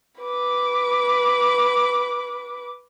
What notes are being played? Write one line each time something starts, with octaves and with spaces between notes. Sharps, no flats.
B4 D6